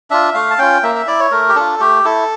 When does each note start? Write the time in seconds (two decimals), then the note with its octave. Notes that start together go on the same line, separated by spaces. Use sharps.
0.10 D4 F4 E5
0.34 A3 F5
0.51 A5
0.58 C#4 F4 G5
0.83 A#3 E5
0.95 E5
1.08 E4 D5
1.20 C#5
1.31 A3 A#4
1.49 G4
1.56 D4 F4 A4
1.80 A3 G4
2.05 E4 A4